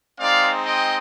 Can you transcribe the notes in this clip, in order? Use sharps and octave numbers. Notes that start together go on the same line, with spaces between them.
G#3 C4 D#4 D5 F5
D#5 G5